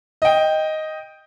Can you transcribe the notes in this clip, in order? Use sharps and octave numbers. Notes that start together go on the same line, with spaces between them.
D#5 G5